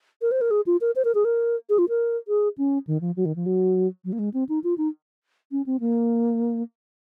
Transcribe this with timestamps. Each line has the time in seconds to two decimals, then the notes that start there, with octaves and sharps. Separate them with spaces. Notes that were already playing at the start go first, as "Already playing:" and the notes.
0.22 A#4
0.31 C5
0.41 A#4
0.51 G#4
0.66 F4
0.81 A#4
0.96 C5
1.05 A#4
1.15 G#4
1.25 A#4
1.69 G#4
1.78 F4
1.89 A#4
2.28 G#4
2.58 C#4
2.87 D#3
3.01 F3
3.16 F#3
3.25 D#3
3.36 F3
3.46 F#3
4.05 F#3
4.12 A#3
4.19 G#3
4.34 C4
4.49 D#4
4.64 F4
4.78 D#4
5.52 C#4
5.66 C4
5.80 A#3